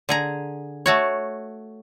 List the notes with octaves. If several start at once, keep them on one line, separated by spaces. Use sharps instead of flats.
D3 G#4 A#5
A3 F#4 C#5